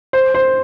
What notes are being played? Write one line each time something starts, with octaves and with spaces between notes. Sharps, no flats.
C5
C5